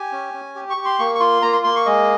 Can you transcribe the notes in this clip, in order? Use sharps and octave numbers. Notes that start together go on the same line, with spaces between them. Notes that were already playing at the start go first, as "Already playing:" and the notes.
Already playing: G4 G#5
C#4
C#4
G4
C#6
G4
C6
A#3 C#6
C#6
F4 C6
A#3 A#5
C6
A#3 C6
C#6
G#3 D#5